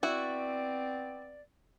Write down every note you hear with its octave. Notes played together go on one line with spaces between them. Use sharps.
B3 C4 E4 F#4 D5